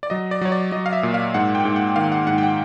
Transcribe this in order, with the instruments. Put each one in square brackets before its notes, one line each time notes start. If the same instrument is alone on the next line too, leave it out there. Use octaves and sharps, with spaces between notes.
[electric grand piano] D5
F#3 D#5
D5
F#3 C#5
D5
F#3 D#5
F5
E5
A#2
F5
G#2 F#5
G5
G#2
F#5
D#3 F5
F#5
G#2 F#5
G5
F#5